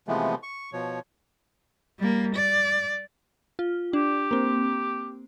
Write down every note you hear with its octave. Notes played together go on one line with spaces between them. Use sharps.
C3 E3 F3 G#3 A3 B3
C#6
B2 F3 C#5
G3 A#3
D5
F4
D4 G4
A#3 C4